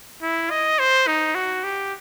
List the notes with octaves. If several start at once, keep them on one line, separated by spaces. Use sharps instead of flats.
E4
D#5
C5
D#4
F#4
G4